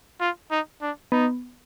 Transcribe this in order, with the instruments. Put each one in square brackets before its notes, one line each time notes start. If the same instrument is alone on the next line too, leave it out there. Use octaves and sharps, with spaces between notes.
[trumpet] F4
D#4
D4
[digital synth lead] B3 [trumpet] D#4